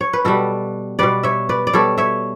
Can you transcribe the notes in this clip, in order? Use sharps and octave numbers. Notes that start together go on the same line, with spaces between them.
C#5
B4
B2 G3 F#4 A4
B2 G3 B4 D5
C#5 E5
B4 D5
D5
B2 G3 A4 C#5
C#5 E5